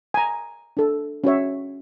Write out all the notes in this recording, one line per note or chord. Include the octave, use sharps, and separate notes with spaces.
G#5 A#5
D4 A4
C#4 F#4 C#5 E5